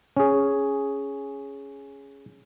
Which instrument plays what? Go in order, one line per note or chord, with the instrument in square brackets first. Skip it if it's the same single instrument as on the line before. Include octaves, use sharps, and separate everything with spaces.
[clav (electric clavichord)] C#4 G#4